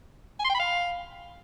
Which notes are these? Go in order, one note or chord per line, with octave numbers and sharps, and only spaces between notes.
G#5
C6
G5
B5
F5